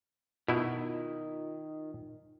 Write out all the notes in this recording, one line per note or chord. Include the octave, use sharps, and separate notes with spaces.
B2 D#3 E4 F4